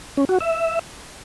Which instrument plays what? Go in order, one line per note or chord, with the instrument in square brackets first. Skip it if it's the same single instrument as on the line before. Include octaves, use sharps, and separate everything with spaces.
[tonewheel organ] C#4
F#4
E5